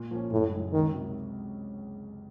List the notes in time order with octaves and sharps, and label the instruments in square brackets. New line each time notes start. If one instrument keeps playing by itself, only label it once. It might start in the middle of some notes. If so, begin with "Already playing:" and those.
Already playing: [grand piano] A#2
F3 A#3 C#4
[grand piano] F#1 [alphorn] A2
[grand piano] F#2 C#3 A3 D#4
[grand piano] C#2 [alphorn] D#3
[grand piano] C3 F#3